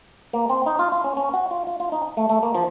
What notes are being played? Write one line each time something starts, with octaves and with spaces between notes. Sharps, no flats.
A#3
C4
D#4
F4
F4
C#4
C#4
F#4
F4
F4
F4
D#4
A3
A3
A#3
F3